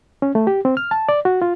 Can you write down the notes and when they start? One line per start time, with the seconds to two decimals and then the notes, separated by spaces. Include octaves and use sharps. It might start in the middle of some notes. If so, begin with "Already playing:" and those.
0.22 C#4
0.35 A3
0.47 G4
0.65 C4
0.77 F6
0.91 A5
1.09 D5
1.25 F#4
1.42 F4